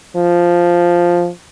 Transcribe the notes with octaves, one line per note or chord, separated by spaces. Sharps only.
F3